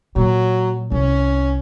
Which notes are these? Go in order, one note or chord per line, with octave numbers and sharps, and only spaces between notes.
A#2 F#3
C2 C#4